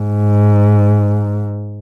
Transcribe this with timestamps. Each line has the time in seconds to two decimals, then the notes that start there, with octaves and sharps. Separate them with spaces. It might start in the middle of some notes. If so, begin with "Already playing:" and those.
Already playing: G#2